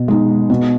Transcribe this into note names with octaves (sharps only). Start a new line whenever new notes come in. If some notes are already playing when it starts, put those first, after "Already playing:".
Already playing: B2
G#3 D#4
B2